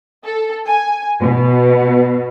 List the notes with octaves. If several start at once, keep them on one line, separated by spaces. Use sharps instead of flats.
A4
G#5
B2